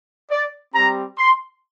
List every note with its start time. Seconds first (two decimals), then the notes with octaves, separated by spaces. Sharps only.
0.31 D5
0.74 G3 C4 G4 A#5
1.18 C6